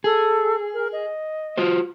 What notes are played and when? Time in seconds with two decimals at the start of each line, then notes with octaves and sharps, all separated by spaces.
0.04 G#4 A4
0.74 A#4
0.92 D#5
1.58 F4 F#4 C5